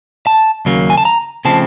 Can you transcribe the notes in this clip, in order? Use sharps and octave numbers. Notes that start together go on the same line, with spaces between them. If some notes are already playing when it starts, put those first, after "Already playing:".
A5
D#2 C#3 F#3 A#3
G#5
A5
A#5
C#3 F3 A3 C4 A5